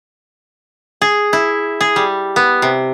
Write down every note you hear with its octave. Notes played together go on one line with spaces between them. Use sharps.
G#4
E4
G#4
G3
B3
C3